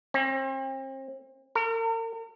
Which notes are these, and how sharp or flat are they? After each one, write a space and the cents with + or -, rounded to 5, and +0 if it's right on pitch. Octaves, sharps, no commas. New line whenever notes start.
C4 +40
A#4 -45